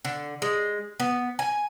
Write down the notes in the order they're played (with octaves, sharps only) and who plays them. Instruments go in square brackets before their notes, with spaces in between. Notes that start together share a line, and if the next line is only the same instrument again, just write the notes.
[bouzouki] D3
G#3
B3
G#5